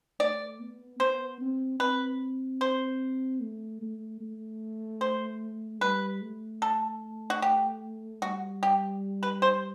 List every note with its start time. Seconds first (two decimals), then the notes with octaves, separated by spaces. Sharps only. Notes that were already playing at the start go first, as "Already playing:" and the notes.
0.20 A3 D5
0.60 B3
1.00 B3 C5
1.41 C4
1.80 C4 B4
2.61 C5
3.41 A3
3.81 A3
4.21 A3
5.01 C5
5.81 G3 B4
6.22 A3
6.62 A4
7.30 F#4
7.42 G4
8.22 G3 F#4
8.63 G4
9.23 B4
9.42 C5